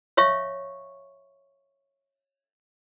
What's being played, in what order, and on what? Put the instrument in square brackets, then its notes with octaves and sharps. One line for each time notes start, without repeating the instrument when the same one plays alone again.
[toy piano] C#5 E5 F5 C#6